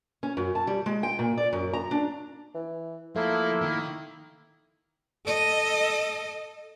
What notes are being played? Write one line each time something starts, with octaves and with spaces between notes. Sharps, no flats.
C#4
F#2
A5
G3
G#3
G5
A#2
D5
F#2
A#5
D4
E3
F3 A3 A#3 E4
D#3
A4 D#5